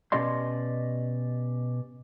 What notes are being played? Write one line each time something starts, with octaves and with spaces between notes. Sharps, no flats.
B2 C#4 G4 D5 D#5 C6